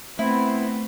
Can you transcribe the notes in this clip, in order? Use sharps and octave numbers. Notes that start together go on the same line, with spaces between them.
A3 B3 C4 E4